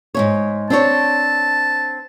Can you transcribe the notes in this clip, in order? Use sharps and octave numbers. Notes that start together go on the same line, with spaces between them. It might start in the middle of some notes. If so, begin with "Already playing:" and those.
G#2 C#3 C#5
C4 D4 C#5 A5